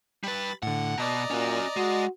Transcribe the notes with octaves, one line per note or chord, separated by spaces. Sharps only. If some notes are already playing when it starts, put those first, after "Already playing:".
G3 B4 B5 A6
A2 D3 F#5
B2 D5 D#5 A#5
A#2 C#4 F#4
G#3 F#4